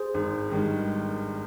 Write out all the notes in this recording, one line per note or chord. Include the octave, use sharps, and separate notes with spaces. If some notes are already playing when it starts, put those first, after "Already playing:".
Already playing: G#4 C5
G#1
G2 D#3 G#3